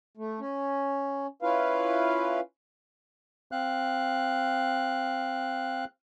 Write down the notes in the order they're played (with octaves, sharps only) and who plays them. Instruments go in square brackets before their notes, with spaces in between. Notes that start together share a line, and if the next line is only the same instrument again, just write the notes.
[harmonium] A3
C#4
C#4 E4 F4 B4 F5
[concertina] C4 F5 F#6